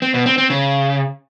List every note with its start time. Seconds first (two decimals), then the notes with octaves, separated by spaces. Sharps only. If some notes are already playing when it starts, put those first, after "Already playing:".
0.02 C4
0.14 B2
0.26 C4
0.38 C4
0.50 C#3